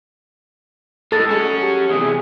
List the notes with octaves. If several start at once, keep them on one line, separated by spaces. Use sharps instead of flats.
A2 G#3 A4 D#6 A6
C#4 F#4 G#4
G4 A5
E2 C3 G#4